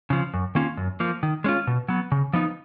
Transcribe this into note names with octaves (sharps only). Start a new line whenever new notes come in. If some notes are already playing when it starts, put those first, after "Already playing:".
C#3 F3
F#2
D#3 A#3 C#4 F4
F#2
F3 A#3
D#3
G#3 C#4 F4
B2
F#3 B3
C#3
F3 B3 D#4